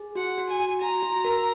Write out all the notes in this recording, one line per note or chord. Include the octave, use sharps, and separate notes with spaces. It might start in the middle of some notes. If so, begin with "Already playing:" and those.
Already playing: G#4
F#4 F#5
F#4
G#5
F#4
F#4 A#5
F#4
A#4